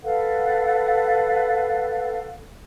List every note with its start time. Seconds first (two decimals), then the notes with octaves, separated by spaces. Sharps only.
0.03 A4 B4 F5 F#5